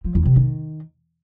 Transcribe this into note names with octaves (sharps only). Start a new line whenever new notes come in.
F3
E2
C3
D#3